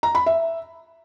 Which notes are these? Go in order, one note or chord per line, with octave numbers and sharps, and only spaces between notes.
A#5
B5
E5